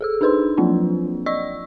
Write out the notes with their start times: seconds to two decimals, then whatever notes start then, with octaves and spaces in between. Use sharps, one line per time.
0.01 G#4 A4 E6
0.21 D4 D#4 G#4 B4 C5 C6
0.57 F3 F#3 A#3 C4 D4 F4
1.26 D5 D#5 C#6 E6